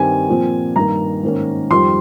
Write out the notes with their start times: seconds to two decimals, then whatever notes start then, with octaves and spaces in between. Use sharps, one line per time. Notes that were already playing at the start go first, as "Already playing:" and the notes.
Already playing: G2 D#3 G3 C4 G#5
0.29 A#2 F3 C4
0.76 G2 D#3 A#3 A#5
1.23 G#2 D#3 A#3 C#4
1.70 F2 D#3 G3 C6